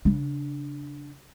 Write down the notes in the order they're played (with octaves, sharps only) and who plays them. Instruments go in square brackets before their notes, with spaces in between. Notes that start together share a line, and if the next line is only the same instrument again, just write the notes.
[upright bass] C#3 D4